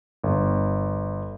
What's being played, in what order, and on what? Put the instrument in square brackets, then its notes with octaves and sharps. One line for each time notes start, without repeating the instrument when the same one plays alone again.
[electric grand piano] G1